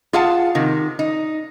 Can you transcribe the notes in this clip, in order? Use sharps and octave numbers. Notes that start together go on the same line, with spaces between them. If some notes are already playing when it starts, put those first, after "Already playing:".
F4 G#4 F5 F#5 A5
C3 D#3
D#4